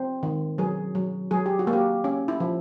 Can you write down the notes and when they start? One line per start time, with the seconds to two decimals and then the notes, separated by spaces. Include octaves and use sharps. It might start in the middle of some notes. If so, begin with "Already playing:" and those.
Already playing: C4 C5
0.23 D#3
0.58 F#3 G#4
0.95 F#3
1.31 F#3 G#4
1.46 G4
1.59 F#4
1.67 A#3
1.73 G4
2.04 C#4
2.28 E4
2.40 F3